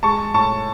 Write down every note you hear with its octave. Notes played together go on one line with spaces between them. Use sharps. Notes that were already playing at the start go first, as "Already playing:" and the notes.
G#3 A5 C#6
A2 A5 C#6